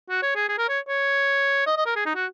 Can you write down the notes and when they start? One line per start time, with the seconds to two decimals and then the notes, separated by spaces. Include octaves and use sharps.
0.10 F#4
0.22 C#5
0.36 G#4
0.49 G#4
0.58 A#4
0.69 C#5
0.88 C#5
1.66 D#5
1.77 D#5
1.86 A#4
1.96 G#4
2.06 D#4
2.15 F#4